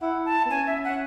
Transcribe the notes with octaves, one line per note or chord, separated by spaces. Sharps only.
E4 F#5
A5
B3
C#4 G#5
E5
C#4 F#5